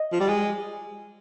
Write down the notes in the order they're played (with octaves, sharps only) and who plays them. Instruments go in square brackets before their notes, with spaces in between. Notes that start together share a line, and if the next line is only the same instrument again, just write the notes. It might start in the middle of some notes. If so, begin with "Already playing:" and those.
Already playing: [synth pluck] D#5
[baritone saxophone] F3
G3
G#3